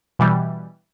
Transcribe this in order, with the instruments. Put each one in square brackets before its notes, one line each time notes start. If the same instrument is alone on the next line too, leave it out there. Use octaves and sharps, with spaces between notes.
[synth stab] B2 E3 G3